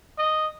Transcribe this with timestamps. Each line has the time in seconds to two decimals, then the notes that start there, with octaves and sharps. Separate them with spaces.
0.18 D#5